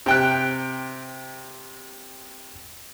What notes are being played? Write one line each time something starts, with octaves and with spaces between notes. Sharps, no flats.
C3 G5 F#6